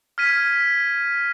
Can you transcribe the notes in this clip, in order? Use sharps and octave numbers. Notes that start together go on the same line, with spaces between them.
F6 G#6 B6 D#7